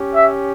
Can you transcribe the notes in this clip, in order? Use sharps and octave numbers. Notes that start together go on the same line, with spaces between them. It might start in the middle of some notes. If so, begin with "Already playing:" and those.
Already playing: C#4 G4
E5